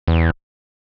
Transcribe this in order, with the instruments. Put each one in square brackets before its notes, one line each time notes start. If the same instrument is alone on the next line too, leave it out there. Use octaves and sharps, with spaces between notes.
[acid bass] E2